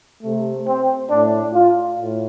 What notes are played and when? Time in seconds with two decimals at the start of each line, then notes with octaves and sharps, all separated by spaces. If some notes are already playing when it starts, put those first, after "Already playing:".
0.23 C3 A3
0.67 C4
1.11 A2 A3 D4
1.54 F4
1.99 A2